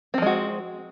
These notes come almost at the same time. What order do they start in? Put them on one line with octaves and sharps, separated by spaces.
C4 F3 G#3 F#4